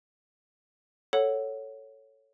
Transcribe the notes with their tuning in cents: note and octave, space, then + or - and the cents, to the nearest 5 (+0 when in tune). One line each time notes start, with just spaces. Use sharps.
A4 +0 C#5 +0 F#5 +0